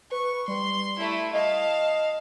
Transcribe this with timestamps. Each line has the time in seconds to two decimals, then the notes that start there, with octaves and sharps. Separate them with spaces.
0.11 B4 C#6
0.48 G3 C6
0.99 A3 E4
1.33 D#5 F5 A5